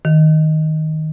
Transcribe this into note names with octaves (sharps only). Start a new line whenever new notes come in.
D#3